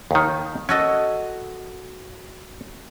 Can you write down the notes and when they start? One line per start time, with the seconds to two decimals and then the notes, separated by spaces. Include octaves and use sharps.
0.11 D#2 D#3
0.69 C#4 F#4 A4 D#5